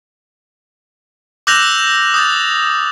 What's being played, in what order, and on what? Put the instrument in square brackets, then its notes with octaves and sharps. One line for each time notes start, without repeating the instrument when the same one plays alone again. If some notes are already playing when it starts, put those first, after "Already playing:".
[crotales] D6 E6 F#6 G6 A#6 F7
D#6 G6 A6